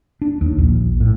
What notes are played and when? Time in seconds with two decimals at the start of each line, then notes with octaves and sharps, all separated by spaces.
0.21 D4
0.41 D#2
0.58 A#1
1.00 A2